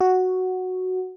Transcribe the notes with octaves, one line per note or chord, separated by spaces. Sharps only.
F#4